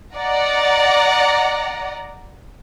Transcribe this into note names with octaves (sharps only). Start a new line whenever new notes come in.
D5 D#5 F#5 A#5